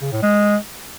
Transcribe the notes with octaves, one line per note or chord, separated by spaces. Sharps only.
C#3
A2
G#3